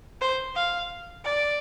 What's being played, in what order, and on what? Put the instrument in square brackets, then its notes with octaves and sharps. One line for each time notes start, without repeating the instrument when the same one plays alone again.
[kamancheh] C5
F5
D5